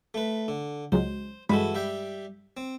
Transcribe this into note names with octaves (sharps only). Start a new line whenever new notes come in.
A3 B4
D3
C#2 F#3 G#3 C5
G2 E3 G#3 F#4 A4 B5
G3 E5 G5
C4